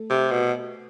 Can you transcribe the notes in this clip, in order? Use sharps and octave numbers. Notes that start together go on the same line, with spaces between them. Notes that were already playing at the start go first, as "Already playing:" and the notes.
Already playing: A3
C3
B2